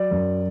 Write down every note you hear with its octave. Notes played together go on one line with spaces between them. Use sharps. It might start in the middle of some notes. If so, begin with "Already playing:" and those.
Already playing: F#3 D5
F#2